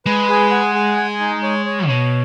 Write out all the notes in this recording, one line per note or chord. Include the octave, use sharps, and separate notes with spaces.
G#3 B4
G#4
F#5
G#4
G#5
D#4
C#5
C#5
B2 C#5